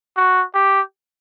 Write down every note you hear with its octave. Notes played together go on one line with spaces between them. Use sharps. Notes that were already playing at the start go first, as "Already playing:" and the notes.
F#4
G4